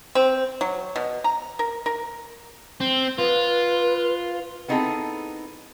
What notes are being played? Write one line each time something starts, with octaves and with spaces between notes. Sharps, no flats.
C4
F#3
B2
A#5
A#4
A#4
C4
F4 B4
B3 C4 D#4 E4 G#4 A4